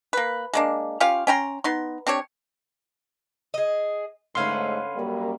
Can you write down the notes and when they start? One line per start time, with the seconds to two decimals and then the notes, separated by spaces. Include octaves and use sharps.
0.13 A#3 B4
0.54 G#3 A#3 D4
1.00 C#4 F4 G4 F5
1.27 C#4 G5 A#5 C6
1.64 B3 D#4 C6
2.07 C4 D4 G4 C#5
3.54 G#4 D#5
4.35 G#2 D3 A3 C#4 B4 F5 C6
4.97 F#2 G3 A#3